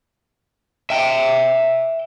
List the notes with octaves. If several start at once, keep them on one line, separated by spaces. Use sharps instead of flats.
E5 G5